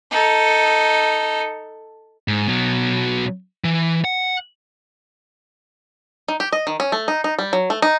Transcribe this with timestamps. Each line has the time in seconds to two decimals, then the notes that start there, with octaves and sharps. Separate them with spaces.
0.11 D#4 A4
2.28 G#2
2.48 B2 F#3
3.64 E3
4.04 F#5
6.28 D#4
6.40 G4
6.53 D#5
6.67 D#3
6.80 C#4
6.92 A3
7.08 D#4
7.24 D#4
7.39 G3
7.53 F#3
7.70 A3
7.82 D#4